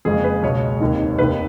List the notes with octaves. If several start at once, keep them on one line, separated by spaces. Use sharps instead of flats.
F#1 F2 C#3 G#3 G#4
B4
C#2 B2 G#3 C#5
F1 D#2 D#3
F1 D#2 D#3 B4